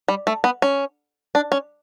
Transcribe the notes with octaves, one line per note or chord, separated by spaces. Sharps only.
G3
A3
B3
C#4
D4
C#4